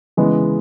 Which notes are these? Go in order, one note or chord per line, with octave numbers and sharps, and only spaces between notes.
C#3 E3 G#3 B3